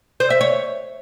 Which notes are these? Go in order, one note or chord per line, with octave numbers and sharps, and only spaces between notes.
C5
E5
C#5